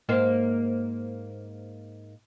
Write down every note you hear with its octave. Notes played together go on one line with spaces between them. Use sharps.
G#2 A#3 C5